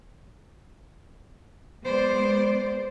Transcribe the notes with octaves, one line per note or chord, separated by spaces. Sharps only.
G#3 B3 C5 D5